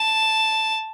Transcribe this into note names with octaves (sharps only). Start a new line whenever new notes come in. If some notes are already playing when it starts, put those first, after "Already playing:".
Already playing: A5